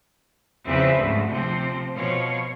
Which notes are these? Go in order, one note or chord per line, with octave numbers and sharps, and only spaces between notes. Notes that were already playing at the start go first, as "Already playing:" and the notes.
E2 C#3 F3 C4 B4 E5
D2 G#2 A3
C3 F3 C4
B2 F3 C#5 F5